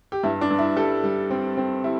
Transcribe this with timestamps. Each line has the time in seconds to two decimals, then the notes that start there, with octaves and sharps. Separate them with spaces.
0.12 G4
0.23 G2 E4
0.41 D4
0.50 G2
0.59 E4
0.76 G3 A4
1.04 G3
1.30 C4
1.57 C4
1.84 G3 E4